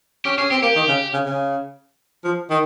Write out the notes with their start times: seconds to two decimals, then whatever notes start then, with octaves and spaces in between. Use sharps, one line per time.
0.25 C#4 G4
0.37 C#4 G#4
0.51 C4 G4
0.62 A#3 G4
0.76 D#3
0.88 C#3
1.13 C#3
1.26 C#3
2.24 F3
2.50 D#3